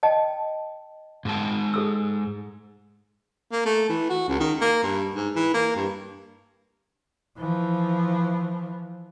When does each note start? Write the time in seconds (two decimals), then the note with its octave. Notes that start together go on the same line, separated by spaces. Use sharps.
0.03 D#5 G5 A5
1.25 G#2 G#3 A5
1.74 G#4 A4 E6
3.52 A#3
3.65 A3
3.89 E3
4.09 F#4
4.28 C#2
4.40 D#3
4.61 A#3
4.83 G2
5.15 G#2
5.35 E3
5.54 A#3
5.76 G2
7.38 E3 F3